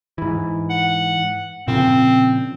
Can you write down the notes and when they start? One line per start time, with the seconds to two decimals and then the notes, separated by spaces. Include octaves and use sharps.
0.18 G#2 E3
0.70 F#5
1.68 A#2 C#3 F3 C4